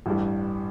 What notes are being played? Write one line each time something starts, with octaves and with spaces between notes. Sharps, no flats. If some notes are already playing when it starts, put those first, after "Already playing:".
A1 G2 E3 G3